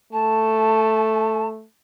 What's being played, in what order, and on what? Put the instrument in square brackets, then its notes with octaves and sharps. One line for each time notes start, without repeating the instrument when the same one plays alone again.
[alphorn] A3 [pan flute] A5